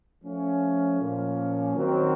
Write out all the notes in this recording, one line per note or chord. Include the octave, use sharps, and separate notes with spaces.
F3 A3 C#4
A#2 F3 A#3 C#4 F4
D#3 F#3 C4 F#4 A#4